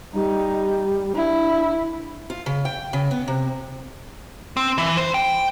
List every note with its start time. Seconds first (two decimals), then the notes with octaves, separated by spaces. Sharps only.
0.14 G3 D#4
1.15 D4 E4
2.30 F4
2.46 C#3
2.65 G5
2.93 C#3
3.11 B3
3.28 C3
4.57 C4
4.78 E3
4.97 C5
5.14 G5